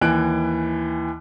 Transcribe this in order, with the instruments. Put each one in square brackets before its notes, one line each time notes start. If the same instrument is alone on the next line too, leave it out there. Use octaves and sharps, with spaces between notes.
[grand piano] D#2 E3 E4 G#5 F#6 D7